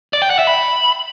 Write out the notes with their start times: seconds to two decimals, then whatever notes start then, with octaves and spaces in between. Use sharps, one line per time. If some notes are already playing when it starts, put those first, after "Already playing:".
0.13 D5
0.22 G5
0.30 F#5
0.39 E5
0.47 B5